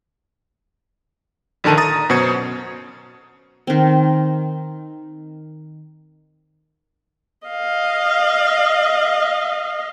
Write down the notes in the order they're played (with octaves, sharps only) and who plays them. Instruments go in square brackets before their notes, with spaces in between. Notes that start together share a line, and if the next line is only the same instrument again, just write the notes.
[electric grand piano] A#1 D3 D#3 A5 D#7
A#5 D#6 A6
F#2 B2 F#4 C5 G#6 C#7
[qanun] D#3 C4
[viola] D#5 F5